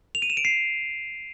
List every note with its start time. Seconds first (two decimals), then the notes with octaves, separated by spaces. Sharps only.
0.15 F7
0.22 D#7
0.30 E7
0.37 D7
0.45 C7